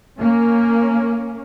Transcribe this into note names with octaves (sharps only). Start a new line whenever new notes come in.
A#3 C#4